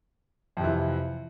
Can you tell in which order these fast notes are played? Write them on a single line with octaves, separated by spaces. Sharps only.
F2 C3 E3